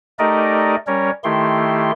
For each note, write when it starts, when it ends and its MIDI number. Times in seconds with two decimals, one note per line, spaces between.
0.19 0.76 57
0.19 0.76 63
0.19 0.76 67
0.19 0.76 70
0.19 0.76 74
0.19 0.76 75
0.87 1.11 55
0.87 1.11 61
0.87 1.11 70
0.87 1.11 73
1.24 1.91 51
1.24 1.91 57
1.24 1.91 64
1.24 1.91 67
1.24 1.91 84